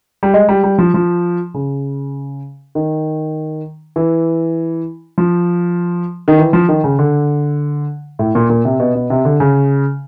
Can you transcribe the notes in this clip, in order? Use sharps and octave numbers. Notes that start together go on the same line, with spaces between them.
G3
G#3
G3
G3
F3
F3
C#3
D#3
E3
F3
D#3
E3
F3
D#3
C#3
D3
A2
A#2
A#2
C3
B2
B2
C3
D3
C#3